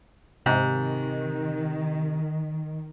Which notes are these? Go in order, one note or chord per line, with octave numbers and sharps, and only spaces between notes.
G#2 C3 D#3